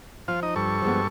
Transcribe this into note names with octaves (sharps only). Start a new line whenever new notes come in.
F3 F4 F5
D#4 D#5
G2 A4 C#6
F3 G#3 B3